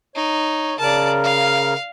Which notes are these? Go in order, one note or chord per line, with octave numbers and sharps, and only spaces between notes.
D#4 C#5
C#3 A#4 D5 A5
F5